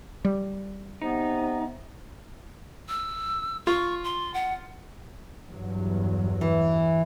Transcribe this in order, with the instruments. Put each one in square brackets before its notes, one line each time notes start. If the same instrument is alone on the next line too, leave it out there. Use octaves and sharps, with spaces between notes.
[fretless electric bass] G3
[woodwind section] C3 B3 [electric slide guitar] D#4
[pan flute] E6
[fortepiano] F4 [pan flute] C#6
[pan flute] C6
F#5
[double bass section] E2 G2 F#3
[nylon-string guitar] E3